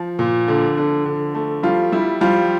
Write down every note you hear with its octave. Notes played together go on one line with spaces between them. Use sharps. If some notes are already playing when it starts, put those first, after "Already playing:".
Already playing: F3
A#2
D3
D3
D3
A3
F3 G3 F4
G3 E4
F3 G3 F4